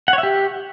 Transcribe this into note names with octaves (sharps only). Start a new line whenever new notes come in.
F#5
C#5
E5
G4